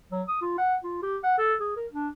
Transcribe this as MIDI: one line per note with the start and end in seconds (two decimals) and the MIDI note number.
0.12 0.23 54
0.28 0.39 87
0.42 0.57 65
0.58 0.75 78
0.84 1.02 65
1.03 1.17 67
1.24 1.35 78
1.38 1.54 69
1.60 1.75 68
1.76 1.87 70
1.92 2.09 62